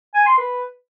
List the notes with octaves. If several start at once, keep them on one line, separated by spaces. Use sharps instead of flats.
G#5
C6
B4